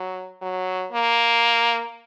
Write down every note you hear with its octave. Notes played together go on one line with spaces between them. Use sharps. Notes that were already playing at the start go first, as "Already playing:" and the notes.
Already playing: F#3
F#3
A#3